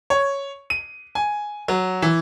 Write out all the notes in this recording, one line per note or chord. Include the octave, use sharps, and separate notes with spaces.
C#5
D#7
G#5
F#3
E3